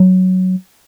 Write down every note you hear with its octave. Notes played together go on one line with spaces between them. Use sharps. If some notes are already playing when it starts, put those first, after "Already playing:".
Already playing: F#3